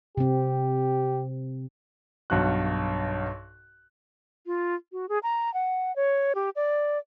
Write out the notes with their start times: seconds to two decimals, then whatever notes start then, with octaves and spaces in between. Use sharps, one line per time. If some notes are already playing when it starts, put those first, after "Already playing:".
0.17 C3 C4 G4
2.30 B1 G2 F#4 F#6
4.46 F4
4.92 F#4
5.09 G#4
5.23 A#5
5.54 F#5
5.96 C#5
6.35 G4
6.56 D5